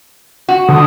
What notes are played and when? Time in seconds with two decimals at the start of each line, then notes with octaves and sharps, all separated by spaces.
0.49 F#4
0.69 D3 D#6